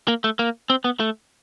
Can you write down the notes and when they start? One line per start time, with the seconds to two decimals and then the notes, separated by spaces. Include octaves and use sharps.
0.08 A#3
0.24 A3
0.39 A#3
0.70 C4
0.84 B3
1.00 A3